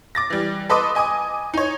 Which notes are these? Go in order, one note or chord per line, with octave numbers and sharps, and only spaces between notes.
D6 A6 A#6
E3 G3
A4 B4 D#5 C6 D6 D#6
D#5 G#5 D6 D#6
D#4 C#5